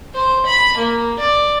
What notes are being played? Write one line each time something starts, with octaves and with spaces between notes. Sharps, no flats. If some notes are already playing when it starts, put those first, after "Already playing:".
C5
B5
A#3
D5